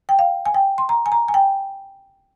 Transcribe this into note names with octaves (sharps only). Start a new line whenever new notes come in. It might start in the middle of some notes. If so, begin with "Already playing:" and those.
G5
F5
G#5
G5
C6
A#5
G#5
A#5
G#5
G5